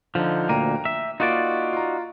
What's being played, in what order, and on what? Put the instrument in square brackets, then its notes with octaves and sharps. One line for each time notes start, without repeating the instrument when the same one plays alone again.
[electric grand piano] D3 D#4 [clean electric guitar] F3
[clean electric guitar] D2 A#2 A#3 [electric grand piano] G5 A#5 D#7
[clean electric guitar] E5
[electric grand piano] A#3 F4 [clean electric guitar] D#4 F#4 D5
[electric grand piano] F4 A#5